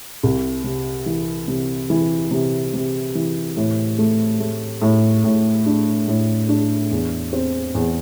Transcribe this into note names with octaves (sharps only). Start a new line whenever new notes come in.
C2
C3
E3
C3
E3
C3
C3
E3
A2
A3
A3
A2
A2
D4
A2
D4
E2
C4
E2